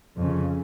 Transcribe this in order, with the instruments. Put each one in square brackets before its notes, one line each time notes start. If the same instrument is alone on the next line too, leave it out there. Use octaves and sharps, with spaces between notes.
[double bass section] F2 C#3